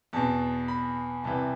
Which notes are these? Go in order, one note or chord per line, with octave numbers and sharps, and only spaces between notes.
E2 B2 A5
B5
C2 C3 E3 A5